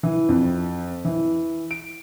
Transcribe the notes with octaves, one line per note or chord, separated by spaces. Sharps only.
E3
F2
E3
D7